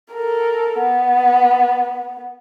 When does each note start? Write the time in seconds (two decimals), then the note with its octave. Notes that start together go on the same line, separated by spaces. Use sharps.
0.13 A4 A#4
0.80 B3